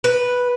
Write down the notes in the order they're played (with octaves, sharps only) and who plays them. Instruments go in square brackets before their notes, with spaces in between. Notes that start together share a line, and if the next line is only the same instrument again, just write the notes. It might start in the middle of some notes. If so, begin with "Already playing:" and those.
[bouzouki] B4